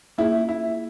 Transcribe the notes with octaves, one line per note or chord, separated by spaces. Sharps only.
A#3 C#4 E4 F4 G#4
E4